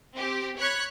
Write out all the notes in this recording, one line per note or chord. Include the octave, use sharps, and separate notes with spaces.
C4 G4
C#5 B5 C#6 F#6 G#6